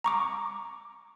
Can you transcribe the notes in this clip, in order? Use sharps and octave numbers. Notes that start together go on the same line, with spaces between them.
A#5 C#6 D6